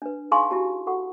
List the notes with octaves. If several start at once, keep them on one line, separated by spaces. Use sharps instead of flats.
D4 B4
D#4 G#4 F5 G#5 C6 C#6
E4 F#4 G4 A5
F#4 A4 F#5 C#6